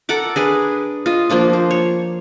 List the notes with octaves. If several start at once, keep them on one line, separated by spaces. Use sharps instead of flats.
A4 A#4 F#5 D6
D4 G#4 B4
F4 D#5
F3 A#3 D4 F4
C5
C#5